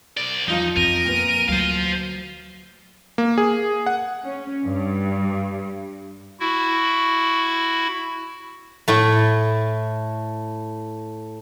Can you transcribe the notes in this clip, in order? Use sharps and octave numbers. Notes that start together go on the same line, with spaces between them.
C2 D5
E2 F3 D#4 F4 D#5
F2 A#4 D#7
A#2 B3
D2 F#3 C5 F5
A#3
G#4
F#5
C#4
G2
E4 F#4
A2 A3